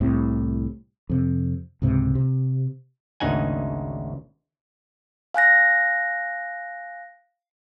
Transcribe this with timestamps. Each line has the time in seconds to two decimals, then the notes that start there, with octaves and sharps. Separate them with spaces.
0.01 C2 A2 C3
1.09 F2 C3
1.82 C#2 G#2 C3 B3
2.15 C3
3.20 G#1 D2 C#3 D#4 F#5 G#5
5.34 F5 G#5 F#6 A#6